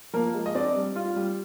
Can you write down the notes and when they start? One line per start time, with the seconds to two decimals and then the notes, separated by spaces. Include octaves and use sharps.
0.13 F3 A#3 A#4
0.34 G#3
0.46 D#5
0.55 C4 D4 D5
0.76 G3
0.96 F4
1.16 G3